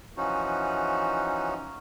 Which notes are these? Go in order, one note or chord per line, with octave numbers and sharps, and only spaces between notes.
E3 F3 C#4 D#4 F#4